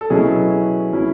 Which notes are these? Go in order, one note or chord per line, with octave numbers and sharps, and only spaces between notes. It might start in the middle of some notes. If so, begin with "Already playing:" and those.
A4
B2 F#3 C#4 E4 G#4
F#3 C#4 E4